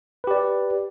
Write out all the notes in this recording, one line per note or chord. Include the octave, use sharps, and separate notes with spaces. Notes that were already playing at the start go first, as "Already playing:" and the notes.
G4 B4 D5